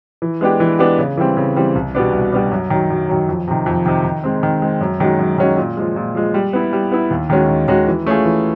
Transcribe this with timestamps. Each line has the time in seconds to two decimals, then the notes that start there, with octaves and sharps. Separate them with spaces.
0.22 E3
0.41 G#3 B3 D4 G4
0.60 E3
0.79 G#3 B3 D4 G4
0.99 C#3
1.17 E3 G3 C4
1.37 C#3
1.56 E3 G3 C4
1.75 C2
1.95 B2 G3 B3 D4
2.13 C2
2.32 B2 G3 B3 D4
2.51 F#2
2.70 D#3 F#3
2.90 F#2
3.09 D#3 F#3
3.29 F2
3.48 C3 D#3
3.66 F2
3.86 C3 D#3
4.04 D#3
4.24 G#3 C4
4.43 D#3
4.62 G#3 C4
4.81 F#2
5.00 D#3 G#3 C#4 F#4
5.19 F#2
5.38 D#3 G#3 C#4 F#4
5.57 A#2
5.77 F3 G#3
5.96 A#2
6.15 F3 G#3
6.34 G3
6.53 B3 E4
6.73 G3
6.92 B3 E4
7.11 D#2
7.30 D#3 G#3 C#4 F#4
7.49 D#2
7.68 D#3 G#3 C#4 F#4
7.87 E3
8.07 A3 C#4 F4 G#4
8.25 E3